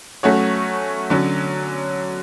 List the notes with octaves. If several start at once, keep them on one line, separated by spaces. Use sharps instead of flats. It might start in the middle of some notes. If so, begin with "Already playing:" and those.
F#3 A3 C#4 F#4 C#5
D3 F#3 C#4